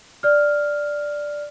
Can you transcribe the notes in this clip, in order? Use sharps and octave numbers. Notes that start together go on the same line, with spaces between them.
D5 F6